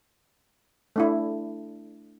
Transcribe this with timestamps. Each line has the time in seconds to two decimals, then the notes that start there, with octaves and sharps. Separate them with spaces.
0.96 A3 D4 E4